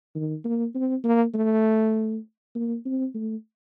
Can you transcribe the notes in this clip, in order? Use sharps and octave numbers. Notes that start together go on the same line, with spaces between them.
D#3
A#3
C4
A#3
A3
A#3
C4
A3